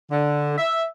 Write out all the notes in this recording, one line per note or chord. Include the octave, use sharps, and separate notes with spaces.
D3
E5